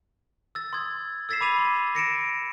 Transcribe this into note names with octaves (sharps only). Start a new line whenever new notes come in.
E6 A6
C6 D#6 G#6
E6 G#6 A6 B6 C7 E7
B5 D6 D#7 F7
C6
A#6 C#7 D7 E7